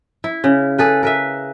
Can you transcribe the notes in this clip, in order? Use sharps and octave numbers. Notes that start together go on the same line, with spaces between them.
E4
C#3
G#4 A4 B4
A#4 B4 E5